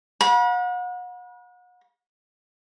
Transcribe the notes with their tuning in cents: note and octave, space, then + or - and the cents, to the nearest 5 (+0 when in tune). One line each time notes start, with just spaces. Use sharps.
F#5 -40 B5 -40